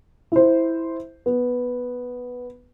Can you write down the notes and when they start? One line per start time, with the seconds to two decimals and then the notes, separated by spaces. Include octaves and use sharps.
0.32 E4 C5
1.26 B3